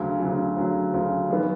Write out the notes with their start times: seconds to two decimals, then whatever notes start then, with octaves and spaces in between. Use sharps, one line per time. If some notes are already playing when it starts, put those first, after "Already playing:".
Already playing: D2 C#3 F#3
0.19 D2 C#3 F#3
0.56 D2 C#3 F#3
0.93 D2 C#3 F#3
1.30 F#2 D#3 G3 B3